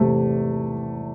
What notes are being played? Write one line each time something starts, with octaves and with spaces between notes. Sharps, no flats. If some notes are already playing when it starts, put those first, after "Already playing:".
Already playing: E2 C3 E3 A3